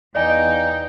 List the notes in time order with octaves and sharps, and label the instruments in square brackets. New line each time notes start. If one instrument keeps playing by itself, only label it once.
[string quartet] E2 D#4 F5 [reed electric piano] D5 D#5 G#5 [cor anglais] G5